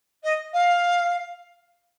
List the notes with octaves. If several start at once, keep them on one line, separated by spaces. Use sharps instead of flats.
D#5
F5